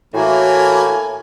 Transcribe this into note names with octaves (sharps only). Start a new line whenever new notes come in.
A2 E3 A#3 F#4 G#5